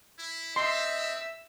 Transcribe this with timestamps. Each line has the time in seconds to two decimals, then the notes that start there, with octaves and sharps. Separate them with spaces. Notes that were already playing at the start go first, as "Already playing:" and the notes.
0.18 E4
0.56 C4 D#5 E5 C6 E6